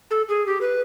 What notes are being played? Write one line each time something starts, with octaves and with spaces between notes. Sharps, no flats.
A4
G#4
G4
B4